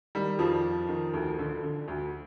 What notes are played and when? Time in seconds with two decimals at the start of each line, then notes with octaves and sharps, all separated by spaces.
0.15 D#3 G3
0.39 F2 F3
0.64 F2
0.89 D#3
1.14 D2
1.38 D3
1.63 D3
1.88 D2